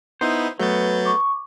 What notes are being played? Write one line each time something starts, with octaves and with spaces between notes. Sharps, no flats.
B3 D#4 E4 C5
F#3 A3 B3 B4 G6 A6
C#6 D6